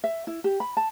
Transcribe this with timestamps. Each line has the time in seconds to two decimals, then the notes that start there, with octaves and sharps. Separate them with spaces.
0.04 E5
0.27 E4
0.44 G4
0.60 B5
0.77 A5